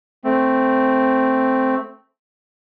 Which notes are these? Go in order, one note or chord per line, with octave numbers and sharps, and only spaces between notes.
A3 C4